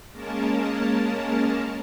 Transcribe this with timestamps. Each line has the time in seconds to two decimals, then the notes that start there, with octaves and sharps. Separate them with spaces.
0.12 G#3 A#3 C#4 A#4 A5